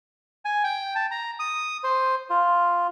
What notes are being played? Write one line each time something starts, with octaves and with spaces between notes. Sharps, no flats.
G#5
G5
A5
A#5
D#6
C5
F4